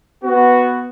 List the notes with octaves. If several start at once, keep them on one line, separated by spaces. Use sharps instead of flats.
B3 F#4